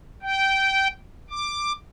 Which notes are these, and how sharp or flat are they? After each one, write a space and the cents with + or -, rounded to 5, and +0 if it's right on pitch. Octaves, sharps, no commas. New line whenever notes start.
G5 -15
D6 +10